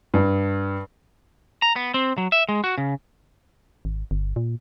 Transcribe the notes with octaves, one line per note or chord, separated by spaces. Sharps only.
G2
A#5
B3
C4
F#3
E5
G#3
F#4
C#3
G#1
G1
A#2